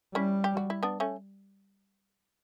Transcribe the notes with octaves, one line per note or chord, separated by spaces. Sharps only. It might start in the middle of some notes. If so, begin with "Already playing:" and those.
G3 C#4 E4
G4
F#4
E4
B3 D4
A3 C#4